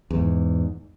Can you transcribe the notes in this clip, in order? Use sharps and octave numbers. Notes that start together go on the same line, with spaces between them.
E2 G#2